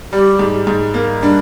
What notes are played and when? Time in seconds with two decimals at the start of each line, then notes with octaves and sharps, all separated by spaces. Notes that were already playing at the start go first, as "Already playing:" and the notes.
0.13 G3 G4
0.39 G#2
0.67 G#2
0.94 A#3
1.22 G3 D4